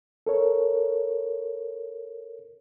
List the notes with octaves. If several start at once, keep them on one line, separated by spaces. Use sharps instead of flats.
A4 A#4 C#5